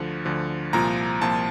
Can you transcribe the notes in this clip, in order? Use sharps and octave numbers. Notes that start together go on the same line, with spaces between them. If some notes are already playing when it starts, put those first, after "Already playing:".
Already playing: D2 D3 F3
D2 D3 F3
C2 A#2 F3 A#5
C2 A#2 F3 A5